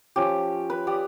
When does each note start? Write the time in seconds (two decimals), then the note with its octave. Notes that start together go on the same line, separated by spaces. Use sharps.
0.16 F3 C#4 G4
0.70 B4
0.87 G4 D5 D#6